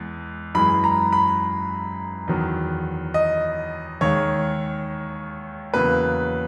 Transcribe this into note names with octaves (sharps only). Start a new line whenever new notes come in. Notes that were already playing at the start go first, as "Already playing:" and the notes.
Already playing: E2 G#3
F#2 E3 G#3 B5
A#5
B5
E2 D#3 F#3
D#5
D#2 D#3 G#3 C#5
E2 C#3 F#3 A#3 B4